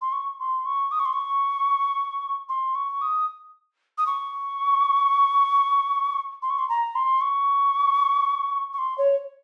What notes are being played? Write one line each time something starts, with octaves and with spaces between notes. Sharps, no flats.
C6
C#6
C6
C#6
D#6
C#6
C6
C#6
C6
C#6
D#6
D#6
C#6
C6
C#6
C6
A#5
C6
C#6
C#6
C6
C#5